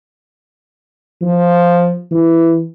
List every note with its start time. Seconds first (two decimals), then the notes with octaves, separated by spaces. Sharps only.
1.22 F3
2.11 E3